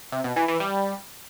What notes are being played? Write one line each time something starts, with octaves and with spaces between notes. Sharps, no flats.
C3
B2
E3
E3
G3